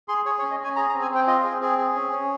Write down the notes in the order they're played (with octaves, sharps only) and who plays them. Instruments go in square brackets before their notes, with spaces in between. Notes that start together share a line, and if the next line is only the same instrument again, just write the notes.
[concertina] G#4 C6
G#4 C#5
C#5
C#4
D#5
C#4 G#5
G#4 A#5
A#5
C4
G#5
C4 G5
F4 D#5
G#4
C4 G#4
G#4
C#4
C#4